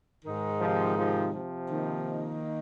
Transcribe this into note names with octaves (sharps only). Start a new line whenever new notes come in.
G#2 D#3 G#3 D#4
C3 F3
C3 F3
C3 F3
D#3 A#3 D#4